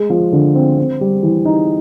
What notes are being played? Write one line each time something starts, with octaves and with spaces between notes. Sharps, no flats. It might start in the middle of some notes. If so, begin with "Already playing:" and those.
Already playing: G#3
F3
D3
C4
C4
G3
E3
D#4